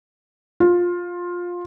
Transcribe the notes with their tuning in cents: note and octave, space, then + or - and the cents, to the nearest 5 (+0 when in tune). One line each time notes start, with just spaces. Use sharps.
F4 +15